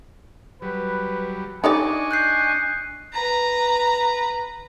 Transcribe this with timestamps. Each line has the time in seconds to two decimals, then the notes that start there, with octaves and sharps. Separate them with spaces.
0.62 F#3 G3 B4
1.64 D4 D#4 G4 D5 D#5 G#5 C#6
2.11 F#6 G6 C7
3.13 B4 A#5